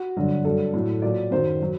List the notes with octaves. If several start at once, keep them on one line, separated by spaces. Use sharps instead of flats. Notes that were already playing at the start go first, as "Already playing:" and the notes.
Already playing: F#4
G2 D3 F#3
G2 F#3 A4
A2 F#3
A#2 F#3 D5
F#2 D#3 F#3 C5
F#3